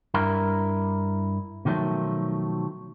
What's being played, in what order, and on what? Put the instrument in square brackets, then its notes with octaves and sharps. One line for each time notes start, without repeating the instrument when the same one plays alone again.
[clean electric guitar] G2 E4 A#4
B2 D#3 F3 F#3 A3